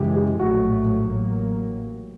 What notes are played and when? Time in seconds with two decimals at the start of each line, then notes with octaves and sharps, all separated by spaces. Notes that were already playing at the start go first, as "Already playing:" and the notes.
Already playing: F#2 C#3 E3 G#3 G4
0.16 G4
0.39 A#1 A2 F#3 A3 F#4
1.08 A1 A2 F#3 A#3